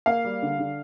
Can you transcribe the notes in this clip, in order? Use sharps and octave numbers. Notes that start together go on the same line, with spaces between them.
A#3 F5
G3
D3
D3